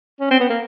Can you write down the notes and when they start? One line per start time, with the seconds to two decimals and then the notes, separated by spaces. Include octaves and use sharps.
0.20 C#4
0.31 C4
0.40 B3
0.50 A#3